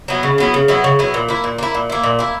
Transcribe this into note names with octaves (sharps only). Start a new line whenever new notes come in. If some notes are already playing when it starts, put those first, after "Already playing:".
F#3 B3 E4
C#3
F#3 B3 E4
C#3
F#3 B3 E4
C#3
F#3 B3 E4
A#2
A#3 E4
A#2
A#3 E4
A#2
A#3 E4
A#2
A#3 E4